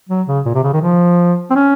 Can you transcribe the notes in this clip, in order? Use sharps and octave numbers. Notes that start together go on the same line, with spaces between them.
F#3
C#3
A#2
C3
C#3
D#3
F3
C4
C#4